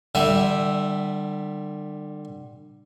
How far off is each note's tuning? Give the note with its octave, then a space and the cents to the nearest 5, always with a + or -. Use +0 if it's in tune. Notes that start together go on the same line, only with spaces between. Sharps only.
D3 +35 G3 +0 E5 +0